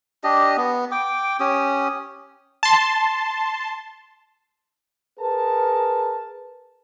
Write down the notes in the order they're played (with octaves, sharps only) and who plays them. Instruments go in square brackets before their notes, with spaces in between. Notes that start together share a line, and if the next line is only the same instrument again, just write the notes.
[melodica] D4 G4 D#5
B3
G5 D6
C#4 G4 D#6
[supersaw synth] A5 C6
[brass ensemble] G#4 A#4 B4 A5